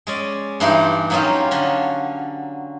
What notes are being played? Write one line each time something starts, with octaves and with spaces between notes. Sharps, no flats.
G#3 C#4 D5
G2 E3 A3 D#4 G4 C6
F#3 A#3 C#4 D#4 F4 G4
D3 C#4